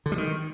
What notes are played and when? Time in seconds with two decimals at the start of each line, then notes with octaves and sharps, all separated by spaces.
0.06 D3
0.12 G3
0.18 D#3